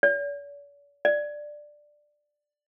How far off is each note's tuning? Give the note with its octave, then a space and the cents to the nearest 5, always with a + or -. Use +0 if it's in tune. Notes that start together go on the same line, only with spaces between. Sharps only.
D5 -45
D5 +10